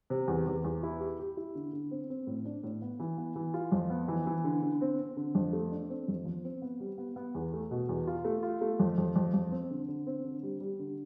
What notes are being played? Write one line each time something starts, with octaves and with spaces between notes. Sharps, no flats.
C3
E2
E2
E2
E4
G4
G4
E4
D3
D3
C4
C4
A2
D4
A2
B3
E3
B3
E3
F4
F2
B3
E3
E3
D3
D3
C4
C4
D3
F2
A3
D4
C4
F2
F3
C4
B3
G3
B3
B3
E2
A3
B2
E2
F4
A3
F4
A3
F2
F2
F2
F2
C4
D3
D3
C4
D3
G3
G3
D3